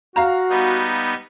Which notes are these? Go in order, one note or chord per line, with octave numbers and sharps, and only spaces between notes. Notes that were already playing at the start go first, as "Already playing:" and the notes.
F#4 F5 A#5
G3 B3 D#4